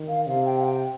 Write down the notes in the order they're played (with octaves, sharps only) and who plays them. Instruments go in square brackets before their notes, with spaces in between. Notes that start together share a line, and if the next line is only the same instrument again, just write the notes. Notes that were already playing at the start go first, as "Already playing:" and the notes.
Already playing: [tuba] D#3
[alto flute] F5
[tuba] C3 [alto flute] F5
[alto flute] G5
F5
G5